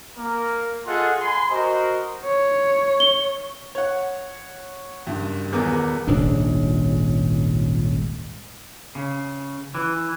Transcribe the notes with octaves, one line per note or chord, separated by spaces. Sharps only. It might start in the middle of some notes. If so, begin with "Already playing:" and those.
A#3 A#4
F4 G#4 A4 D#5 F#5
G#5 B5 C6
F#4 A#4 C5 D#5
C#5
G7
C#5 F#5
F#1 G2
D#1 E2 B3 G#4 A#4 D6
D#1 G#1 C#2 D4
C#3
E3